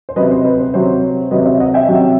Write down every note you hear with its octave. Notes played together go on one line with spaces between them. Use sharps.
C5
C3 F#3 B4 D#5
C5
B4
C5
C3 F#3 C5
C3 F#3 B4 D#5
C5 E5
D#5 F#5
E5 G5
C3 F#3